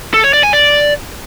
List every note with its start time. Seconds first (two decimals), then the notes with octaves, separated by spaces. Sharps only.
0.14 A4
0.24 C#5
0.33 D5
0.43 G#5
0.53 D5